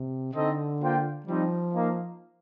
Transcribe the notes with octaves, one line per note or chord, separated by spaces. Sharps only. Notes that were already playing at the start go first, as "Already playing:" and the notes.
Already playing: C3
D3 C4 D#4 A4 D#5
A#3 F4 C5 G5
F3 G3 C4 D#4
A#3 D#4 A#4 F5